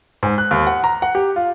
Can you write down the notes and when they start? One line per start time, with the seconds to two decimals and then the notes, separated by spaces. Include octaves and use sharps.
0.23 G#2
0.38 F#6
0.51 D#2
0.67 F#5
0.84 A#5
1.02 F#5
1.15 G4
1.36 F4